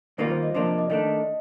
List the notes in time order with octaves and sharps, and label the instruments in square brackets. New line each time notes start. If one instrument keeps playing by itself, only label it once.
[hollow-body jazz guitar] D#2 D#3 G3 A#3 F4 [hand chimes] D5
[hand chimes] C5
D#5
[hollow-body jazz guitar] C3 F3 A#3 D4 [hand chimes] D5
[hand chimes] D5
D#5
[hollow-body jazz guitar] D#3 A3 D4 [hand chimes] D#5